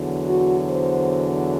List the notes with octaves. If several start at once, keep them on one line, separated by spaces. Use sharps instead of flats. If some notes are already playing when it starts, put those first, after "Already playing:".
Already playing: E2 D3 F#3
F#4
C5